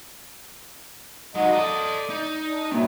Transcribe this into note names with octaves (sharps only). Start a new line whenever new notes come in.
F#3 G#3 D#4 F#4 D#5
A4 D5 D#5
D#4
D4
G2 A#2 F#3 G3 E4